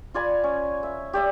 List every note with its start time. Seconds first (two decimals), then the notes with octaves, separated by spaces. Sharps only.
0.14 F4 D5 G#5 B5
0.44 C#4
0.83 E5
1.13 G4 D5 E5 D#6